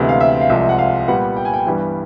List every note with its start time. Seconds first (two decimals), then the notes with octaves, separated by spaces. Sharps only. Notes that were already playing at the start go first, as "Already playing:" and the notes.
Already playing: D2 C3 E3 G#3 B3
0.09 F5
0.20 E5
0.41 F5
0.49 C2 C3 F3 G#3 E5
0.69 F#5
0.79 F5
1.08 A#2 G3 B3 F#5
1.37 G5
1.45 G#5
1.53 G5
1.66 G2 E3 G3 B3